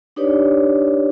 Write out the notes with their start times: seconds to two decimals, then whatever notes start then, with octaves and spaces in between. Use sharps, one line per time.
0.16 D4 D#4 G4 B4 C#5 D5